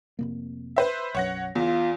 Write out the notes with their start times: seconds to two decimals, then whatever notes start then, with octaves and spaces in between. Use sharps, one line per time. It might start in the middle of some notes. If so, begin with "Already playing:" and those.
0.19 F1 C3 A#3
0.76 B4 C5 E5
1.15 B1 F#2 C#5 F#5 A#6
1.55 E2 B3 F4